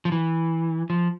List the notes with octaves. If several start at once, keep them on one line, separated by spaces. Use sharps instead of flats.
F3
E3
F3